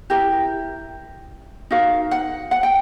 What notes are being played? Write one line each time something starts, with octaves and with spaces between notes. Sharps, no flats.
E4 G4 A#4
D#4 F#4 A#4 F5
F#5
F#5
G5